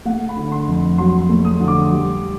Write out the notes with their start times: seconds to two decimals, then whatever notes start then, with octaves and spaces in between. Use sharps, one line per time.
0.05 A3 F#5
0.29 B5
0.36 D3
0.52 C6
0.68 F2
0.98 F#3 C6
1.29 A3
1.45 D#6
1.60 D3
1.68 D6
1.91 G3